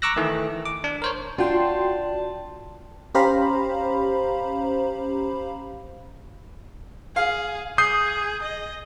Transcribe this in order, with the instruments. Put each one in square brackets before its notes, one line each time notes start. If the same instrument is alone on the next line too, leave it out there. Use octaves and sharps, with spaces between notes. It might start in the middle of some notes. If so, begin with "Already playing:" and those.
[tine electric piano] A#5 C#6 D6 E6 F#6 A#6
D#3 E3 A3
D6
D4
A#4 C5 C#5
[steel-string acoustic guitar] D4 [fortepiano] F4 [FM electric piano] F#4 G5 C6 [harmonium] A5
[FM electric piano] C#4 G4 C5 F5 A#5 B5
[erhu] G#4 [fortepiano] F5
[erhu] G#4 [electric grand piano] D#6 G6 C7
[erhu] D#5